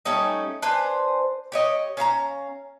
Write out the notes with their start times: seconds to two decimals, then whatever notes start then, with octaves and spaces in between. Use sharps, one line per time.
0.05 G3 A3 C#4 D#4
0.62 D4 B4 C5 G#5
1.52 G4 C#5 D#5
1.97 C#4 F5 A5 A#5